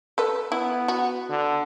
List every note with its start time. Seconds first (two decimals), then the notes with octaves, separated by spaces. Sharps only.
0.18 A4 B4
0.52 B3 E4
0.88 F#4
1.30 D3